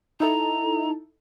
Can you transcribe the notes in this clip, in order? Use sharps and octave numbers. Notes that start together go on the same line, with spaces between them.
D#4 E4 A4 A#5